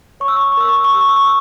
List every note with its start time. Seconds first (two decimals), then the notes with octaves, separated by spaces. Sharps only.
0.20 C#5 C#6
0.28 E6
0.36 C#6
0.44 E6
0.52 C#6
0.57 A#4 E6
0.68 C#6
0.77 E6
0.84 C#6
0.93 G4 E6
1.01 C#6
1.09 E6
1.16 C#6
1.25 E6